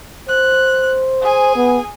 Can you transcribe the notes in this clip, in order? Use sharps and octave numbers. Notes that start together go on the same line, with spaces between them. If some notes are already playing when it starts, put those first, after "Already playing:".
C5 F#6
G#4 G#5
B3